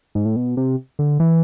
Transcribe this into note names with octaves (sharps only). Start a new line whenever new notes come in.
G#2
A2
B2
C3
D3
E3